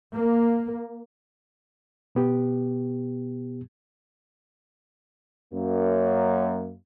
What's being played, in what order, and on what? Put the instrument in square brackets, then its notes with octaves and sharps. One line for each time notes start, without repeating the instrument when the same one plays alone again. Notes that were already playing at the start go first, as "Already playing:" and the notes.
[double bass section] A#3
[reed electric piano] B2 B3 G4
[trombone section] F#2 A#3